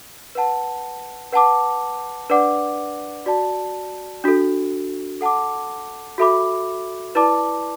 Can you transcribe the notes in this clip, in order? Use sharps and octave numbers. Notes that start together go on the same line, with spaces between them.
B4 F#5 A5
B4 F#5 A5 D6
D4 B4 D5 F#5 D6
F#4 D5 A5
D4 F#4 A4
A4 F#5 A5 D6
F#4 A4 E5 B5 D6
E4 B4 D5 A5 D6